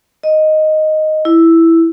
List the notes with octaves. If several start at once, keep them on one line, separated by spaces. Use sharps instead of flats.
D#5
E4